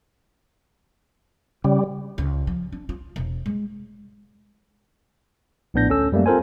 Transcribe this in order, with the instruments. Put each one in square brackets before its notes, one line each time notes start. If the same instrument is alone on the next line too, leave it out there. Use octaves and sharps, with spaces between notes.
[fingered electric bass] C#3 [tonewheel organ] G3
[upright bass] C#2
F3
D4
F4
E1
G#3
[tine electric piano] A#1 A2 B3 D4 G6 A#6
D2 C#4 A4 E6
F#2 G3 A3 A#3
C4 F4 A4 A#4 C5 G#5